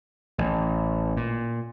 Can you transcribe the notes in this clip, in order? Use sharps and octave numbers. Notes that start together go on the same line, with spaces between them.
A1
A#2